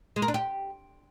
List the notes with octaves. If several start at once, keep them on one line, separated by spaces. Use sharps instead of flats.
G#3
A#4
D4
G4